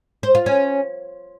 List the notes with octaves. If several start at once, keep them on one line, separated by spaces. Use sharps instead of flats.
C5
F4
C#4